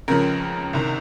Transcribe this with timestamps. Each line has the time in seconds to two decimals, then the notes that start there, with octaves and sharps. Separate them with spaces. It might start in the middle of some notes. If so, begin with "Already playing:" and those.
0.08 C#2 C#3 F3 A#4
0.73 C2 C3 D#3